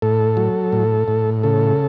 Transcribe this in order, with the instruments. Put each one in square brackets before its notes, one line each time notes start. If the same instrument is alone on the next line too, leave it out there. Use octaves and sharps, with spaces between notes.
[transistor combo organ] A2 A4
F#3
A2
A2
C#3 A4